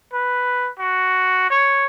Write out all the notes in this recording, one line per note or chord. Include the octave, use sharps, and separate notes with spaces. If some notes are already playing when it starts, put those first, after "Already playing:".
B4
F#4
C#5